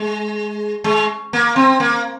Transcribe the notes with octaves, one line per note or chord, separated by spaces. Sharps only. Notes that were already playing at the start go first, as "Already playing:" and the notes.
Already playing: G#3
G#3
A#3
C4
A#3